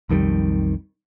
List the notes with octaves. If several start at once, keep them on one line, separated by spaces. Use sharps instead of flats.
B1 F2 D#3 G3